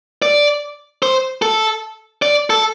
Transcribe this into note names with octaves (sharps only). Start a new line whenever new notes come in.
D5
C5
A4
D5
A4